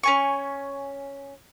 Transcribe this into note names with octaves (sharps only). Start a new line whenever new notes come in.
C#4 G#5 C#6